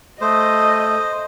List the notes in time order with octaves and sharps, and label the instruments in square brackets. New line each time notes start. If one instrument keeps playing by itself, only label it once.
[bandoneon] A3 [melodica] C5 [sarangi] D#5 [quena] D#6